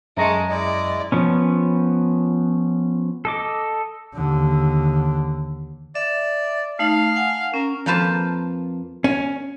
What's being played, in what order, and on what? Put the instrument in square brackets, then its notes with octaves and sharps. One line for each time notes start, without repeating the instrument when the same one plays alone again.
[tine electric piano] F#2 C#6 C#7 [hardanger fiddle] G#3 A4 [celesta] E5 A#5 A#6
[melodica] G#3 E4 D#5 [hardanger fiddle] D5
[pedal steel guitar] F3 B3 C#4
A4 D#5 D6
[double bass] D#2 D3
[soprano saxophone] D5 [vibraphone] E5
[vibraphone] A3 D#4 [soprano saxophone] F5
[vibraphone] F#5 G#5
[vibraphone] C#4 [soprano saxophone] A#4
[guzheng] F2 F3 A#3 B4 C5 A5
[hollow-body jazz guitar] C#4